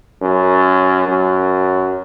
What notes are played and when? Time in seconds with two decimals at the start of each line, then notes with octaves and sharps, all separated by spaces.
0.21 F#2
1.07 F#2